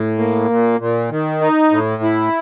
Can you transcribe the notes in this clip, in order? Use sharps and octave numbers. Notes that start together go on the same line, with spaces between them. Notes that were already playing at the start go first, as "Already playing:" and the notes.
Already playing: A2
A#3
A#2
A#2
D#3
D#4
A2
E4